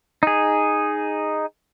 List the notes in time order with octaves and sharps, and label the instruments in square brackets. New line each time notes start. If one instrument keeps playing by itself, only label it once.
[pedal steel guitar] D#4 G#4